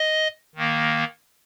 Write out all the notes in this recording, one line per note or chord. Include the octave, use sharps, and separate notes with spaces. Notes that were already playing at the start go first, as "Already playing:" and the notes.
Already playing: D#5
D#3 A#3